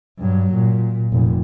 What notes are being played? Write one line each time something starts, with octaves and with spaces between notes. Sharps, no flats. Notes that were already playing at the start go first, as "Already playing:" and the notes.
G2 F#3
A#2
F1 A#2